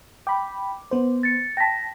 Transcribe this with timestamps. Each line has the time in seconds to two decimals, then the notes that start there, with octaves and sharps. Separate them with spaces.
0.27 G5 B5 D6
0.91 B3 C5
1.23 A6 C#7
1.57 G5 A5 A#6 B6